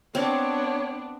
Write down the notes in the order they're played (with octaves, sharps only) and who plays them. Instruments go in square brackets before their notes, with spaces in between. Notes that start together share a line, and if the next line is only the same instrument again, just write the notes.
[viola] B3 D4 [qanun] C4 [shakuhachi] C#5